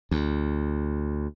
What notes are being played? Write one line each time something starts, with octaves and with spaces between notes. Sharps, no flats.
D2